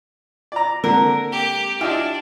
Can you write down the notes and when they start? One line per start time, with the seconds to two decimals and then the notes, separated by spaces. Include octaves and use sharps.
0.52 D5 A#5
0.84 D3 G#3 A#3 C4 A#4
1.32 G4
1.81 D4 E4 F4 G4 D#5 F6